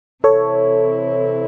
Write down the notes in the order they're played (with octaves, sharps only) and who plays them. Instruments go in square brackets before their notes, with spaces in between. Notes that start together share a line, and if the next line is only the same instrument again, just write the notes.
[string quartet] C3 E3 C4 E4 [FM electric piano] A4 C#5